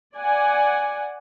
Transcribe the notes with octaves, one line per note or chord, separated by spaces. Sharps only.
D5 F#5 G#5